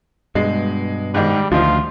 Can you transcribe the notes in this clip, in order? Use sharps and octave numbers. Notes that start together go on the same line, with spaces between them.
G2 B2 G#3
G#2 D#3 G3
D2 D#3 F3 F4